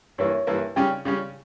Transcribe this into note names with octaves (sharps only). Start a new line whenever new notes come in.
G2 E3 A#3 E4 C#5
G2 E3 A#3 E4
C#3 G3 C#4 G5
C#3 G3 C#4